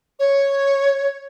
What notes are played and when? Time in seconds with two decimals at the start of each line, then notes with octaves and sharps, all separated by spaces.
0.19 C#5